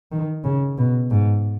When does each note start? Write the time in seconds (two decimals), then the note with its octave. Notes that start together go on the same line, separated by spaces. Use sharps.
0.12 D#3
0.44 C#3
0.78 B2
1.11 G#2